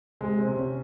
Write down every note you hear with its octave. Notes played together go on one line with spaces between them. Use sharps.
C3 G#3
C4
C3
C#4